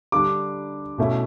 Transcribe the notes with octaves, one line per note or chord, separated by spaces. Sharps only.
D3 G3 D4 D6
B2 A3 C#4 E4